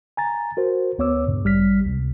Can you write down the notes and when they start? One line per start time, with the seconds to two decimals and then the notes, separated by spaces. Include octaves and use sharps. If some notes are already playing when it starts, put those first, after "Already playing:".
0.17 G#5 A#5 A6
0.57 F#4 A#4 C5
0.98 D2 B3 C#5 D6 E6
1.27 G2 A#2 C#3
1.44 A1 G3 F6 B6
1.86 C#2 C3